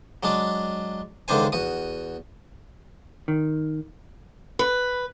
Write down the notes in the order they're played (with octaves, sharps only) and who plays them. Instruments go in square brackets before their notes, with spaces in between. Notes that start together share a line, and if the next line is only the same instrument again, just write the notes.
[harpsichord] F#3 G#3 D4
C#2 D3 D#3 D4 C5 G#5
E2 F#4 D#6
[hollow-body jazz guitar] D#3
[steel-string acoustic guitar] B4